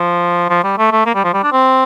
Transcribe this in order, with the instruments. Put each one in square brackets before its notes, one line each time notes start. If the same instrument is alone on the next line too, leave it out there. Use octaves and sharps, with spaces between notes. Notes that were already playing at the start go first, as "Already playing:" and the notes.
Already playing: [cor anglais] F3
F3
G3
A3
A3
A#3
G3
F3
G3
D4
C4